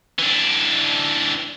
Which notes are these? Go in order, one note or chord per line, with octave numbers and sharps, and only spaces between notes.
E3 D4